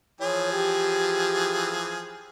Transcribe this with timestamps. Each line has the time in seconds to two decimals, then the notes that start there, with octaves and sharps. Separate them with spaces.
0.21 E3 F3 G#4 C#5
0.53 G4